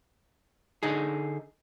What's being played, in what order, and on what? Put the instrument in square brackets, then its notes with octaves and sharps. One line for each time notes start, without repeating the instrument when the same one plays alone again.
[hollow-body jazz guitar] D3 D#4 G#4